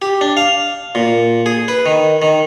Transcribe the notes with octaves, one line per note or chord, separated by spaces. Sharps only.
G4
D4
F5
A#2
G#4
B4
D#3
D#3